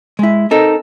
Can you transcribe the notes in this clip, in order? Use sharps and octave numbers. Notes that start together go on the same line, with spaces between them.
G#3 E4
C4 D#4 A4 A#4